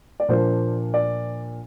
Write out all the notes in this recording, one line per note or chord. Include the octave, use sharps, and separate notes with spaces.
D5
A#2 F3 A#3 D4 C5
D5